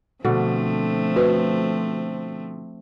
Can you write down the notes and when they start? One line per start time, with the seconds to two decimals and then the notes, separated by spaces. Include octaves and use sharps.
0.25 B2 D3 F3 A3 C4
1.16 F#4 B4